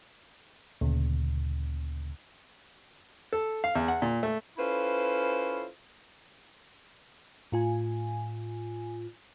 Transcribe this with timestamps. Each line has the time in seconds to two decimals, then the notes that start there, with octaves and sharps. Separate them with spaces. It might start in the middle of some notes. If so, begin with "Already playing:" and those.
0.81 D2 A#2 C#3
3.33 A4
3.64 F5
3.75 E2
3.88 F#5
4.02 A#2
4.23 A3
4.57 C#4 E4 F4 A4 B4 C5
7.52 A2 F4 G#5